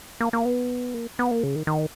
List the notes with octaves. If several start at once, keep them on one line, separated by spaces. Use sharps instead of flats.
A#3
A#3
B3
A#3
B3
A#3
C#3
D#3
D#3